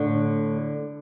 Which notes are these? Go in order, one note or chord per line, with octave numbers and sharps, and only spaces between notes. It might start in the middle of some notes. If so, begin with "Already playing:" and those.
Already playing: A2 D3